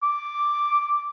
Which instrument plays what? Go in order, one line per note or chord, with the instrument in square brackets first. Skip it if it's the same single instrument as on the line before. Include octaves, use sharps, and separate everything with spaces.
[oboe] D6